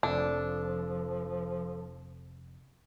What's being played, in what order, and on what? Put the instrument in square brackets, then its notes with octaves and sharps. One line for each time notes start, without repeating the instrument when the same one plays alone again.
[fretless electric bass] F1 [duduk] F3 [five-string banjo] D4 [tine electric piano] A4